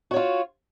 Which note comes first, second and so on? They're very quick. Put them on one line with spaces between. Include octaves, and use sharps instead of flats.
F#4 C#5 F4